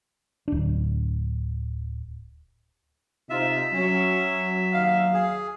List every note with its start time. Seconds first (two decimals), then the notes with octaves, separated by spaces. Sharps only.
0.48 D1 D4
3.30 C3 D#4 F4 E5
3.73 F#3 C#4
4.73 D#2 D#4 F5
5.14 G#4